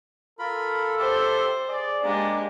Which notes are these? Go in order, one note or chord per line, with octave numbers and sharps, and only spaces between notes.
F4 A4 A#4 B5
G4 C5 D5 E5
G#4 D5
G#3 A#3 D4 G4 D5